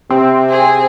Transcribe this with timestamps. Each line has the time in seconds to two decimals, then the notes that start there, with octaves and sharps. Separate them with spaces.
0.10 C3 C4
0.50 G#4